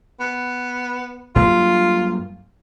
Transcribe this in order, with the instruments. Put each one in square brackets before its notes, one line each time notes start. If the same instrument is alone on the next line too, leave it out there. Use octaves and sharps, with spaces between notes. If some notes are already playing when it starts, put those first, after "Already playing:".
[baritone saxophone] B3
[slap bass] G2 F#3 A#3 [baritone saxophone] F4